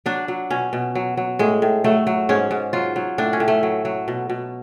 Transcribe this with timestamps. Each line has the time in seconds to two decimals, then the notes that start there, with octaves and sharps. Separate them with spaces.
0.06 F#3 D4
0.28 F#3
0.50 B2 C#4
0.73 B2
0.95 F#3
1.17 F#3
1.39 A2 G#3
1.62 A2
1.84 F#3 A3
2.07 F#3
2.29 G#2 C#4
2.51 G#2
2.73 F#3 F4
2.96 F#3
3.18 A2 D4
3.33 C#4
3.40 A2
3.48 A3
3.63 F#3
3.85 F#3
4.08 B2
4.30 B2